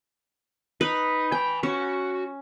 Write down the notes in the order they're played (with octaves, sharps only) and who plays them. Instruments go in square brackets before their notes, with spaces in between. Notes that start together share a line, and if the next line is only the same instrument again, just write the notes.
[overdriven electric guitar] D#4 [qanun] B4
[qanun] G5 [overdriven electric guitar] G#5 B5
[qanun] C#4 [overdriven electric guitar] F#4